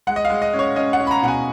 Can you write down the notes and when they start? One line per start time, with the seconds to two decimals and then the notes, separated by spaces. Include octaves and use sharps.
0.07 G#3 F#5
0.16 D#5
0.25 F5
0.30 G#3
0.42 D#5
0.53 C#4
0.59 C#5
0.76 C#4 D#5
0.93 F#5
1.00 C#4
1.07 B5
1.11 A#5
1.22 B2 F#5
1.28 G#5